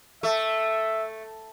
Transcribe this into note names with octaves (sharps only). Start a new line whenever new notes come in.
A3 E5